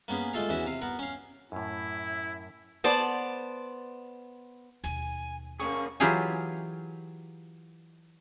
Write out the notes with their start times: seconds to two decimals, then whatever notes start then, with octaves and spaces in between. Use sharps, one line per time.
0.08 A#3 B3 C#4 G#4 B4
0.34 G#3 A3 F4 A4 F5
0.49 E2 E3 C#4 F#4 E5
0.66 C3 F5
0.82 B3 A#4 F#5
0.99 C#4 F5
1.52 F#2 A2 E4
2.84 B3 C5 D5 A5
4.84 D#2 B2 G#5
5.60 A#3 C#4 G#4 C#6
6.00 E3 F#3 F4 G4 G#4 G#5